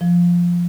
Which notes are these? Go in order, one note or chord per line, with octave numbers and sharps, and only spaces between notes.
F3